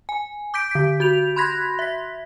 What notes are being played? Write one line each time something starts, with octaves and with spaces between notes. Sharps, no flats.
G#5
D6 G6 B6 D7
D3 B6
F#4 G6 F7
B5 C6 F#6 G#6 A#6 B6
E5 B6